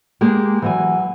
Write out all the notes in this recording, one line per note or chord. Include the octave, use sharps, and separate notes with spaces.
G#3 A#3 G4 G#4
E3 F#3 G#5